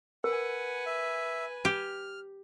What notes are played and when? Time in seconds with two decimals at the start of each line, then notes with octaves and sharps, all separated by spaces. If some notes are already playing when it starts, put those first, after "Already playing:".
0.24 A#4 B4 F#5 G#5
0.86 E5
1.65 G4 F6